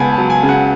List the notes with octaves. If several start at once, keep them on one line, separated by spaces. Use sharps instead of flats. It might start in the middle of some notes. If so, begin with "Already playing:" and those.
Already playing: C#2 B3 G#5 A5
A5
F#3
G#5
C#3
F#5